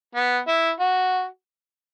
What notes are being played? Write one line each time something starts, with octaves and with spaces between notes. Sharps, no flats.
B3
E4
F#4